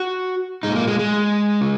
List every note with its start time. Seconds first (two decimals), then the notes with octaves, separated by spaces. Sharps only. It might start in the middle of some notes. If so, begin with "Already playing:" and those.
Already playing: F#4
0.63 A#2 G#3 D#4
0.76 A#3
0.87 G#3
0.99 G#3
1.61 C#3